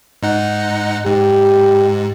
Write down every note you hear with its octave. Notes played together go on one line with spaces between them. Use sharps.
G#2 D#4 F#5
G#2 G4